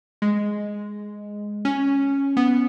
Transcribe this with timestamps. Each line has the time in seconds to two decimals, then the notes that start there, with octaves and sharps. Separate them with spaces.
0.22 G#3
1.65 C#4
2.37 B3